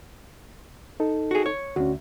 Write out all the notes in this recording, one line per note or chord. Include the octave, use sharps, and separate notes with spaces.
D#4 A4
F#4 G#4
C#5
D2 C#4 F#4